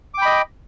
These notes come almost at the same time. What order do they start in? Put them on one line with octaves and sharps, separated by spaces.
D6 G5 B5 D#5